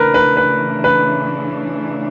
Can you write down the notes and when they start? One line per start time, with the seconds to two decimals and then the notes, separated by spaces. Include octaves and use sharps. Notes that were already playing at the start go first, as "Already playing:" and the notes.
Already playing: C#3 E3 A3 D4 A#4 B4
0.14 B4
0.37 B4
0.84 B4